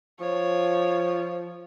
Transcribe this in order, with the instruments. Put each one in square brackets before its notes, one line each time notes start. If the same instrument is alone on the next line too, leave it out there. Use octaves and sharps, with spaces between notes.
[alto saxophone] F3 [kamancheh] C#5